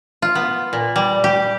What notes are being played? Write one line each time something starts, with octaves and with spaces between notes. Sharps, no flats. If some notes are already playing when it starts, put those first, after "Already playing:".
F4
B3
A#2
G3
G4